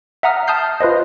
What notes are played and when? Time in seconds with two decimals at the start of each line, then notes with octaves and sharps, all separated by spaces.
0.23 E5 F#5 A#5 D#6 F6
0.47 A5 D#6 F6 G6 C7
0.81 F4 B4 C5 D#5